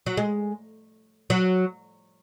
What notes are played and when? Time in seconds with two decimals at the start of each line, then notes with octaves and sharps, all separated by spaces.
0.06 F#3
0.17 G#3
1.30 F#3